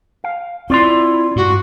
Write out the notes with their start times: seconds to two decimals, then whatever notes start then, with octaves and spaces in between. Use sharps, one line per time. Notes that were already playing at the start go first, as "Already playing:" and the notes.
0.24 F5
0.70 C4 E4 F4 D5 C6
1.36 G2 F#4